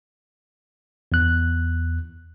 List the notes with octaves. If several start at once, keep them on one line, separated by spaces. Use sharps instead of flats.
E2 F#6